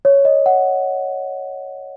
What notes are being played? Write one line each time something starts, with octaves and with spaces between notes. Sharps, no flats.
C#5
D#5
F#5